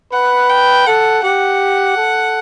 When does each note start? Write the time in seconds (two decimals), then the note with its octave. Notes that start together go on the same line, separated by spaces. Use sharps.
0.13 B4 F#5
0.50 G5
0.86 A4 F#5
1.23 G4 F#5
1.97 A4